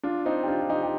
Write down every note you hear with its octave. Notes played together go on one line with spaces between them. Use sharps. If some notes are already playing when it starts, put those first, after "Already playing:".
D4 F4
C4 D#4
G4
D4 F4
F4
D#4 G4
G4